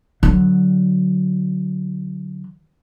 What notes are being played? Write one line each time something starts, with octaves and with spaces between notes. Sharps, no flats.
D3 F#3